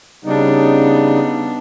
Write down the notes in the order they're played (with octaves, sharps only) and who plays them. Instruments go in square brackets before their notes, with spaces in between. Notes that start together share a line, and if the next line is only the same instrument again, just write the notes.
[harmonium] C#3 G3 D#4 [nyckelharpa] B3 D4